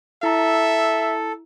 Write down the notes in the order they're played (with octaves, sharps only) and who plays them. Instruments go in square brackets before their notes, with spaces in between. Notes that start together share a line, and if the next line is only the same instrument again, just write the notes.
[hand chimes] E4 A#5 [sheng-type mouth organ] A4 [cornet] E5